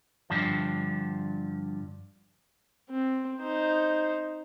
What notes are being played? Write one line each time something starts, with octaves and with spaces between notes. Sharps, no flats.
G2 D3 F3
C4
D#4 C5